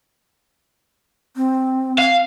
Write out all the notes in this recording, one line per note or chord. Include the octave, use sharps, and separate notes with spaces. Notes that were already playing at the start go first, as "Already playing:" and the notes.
C4
F5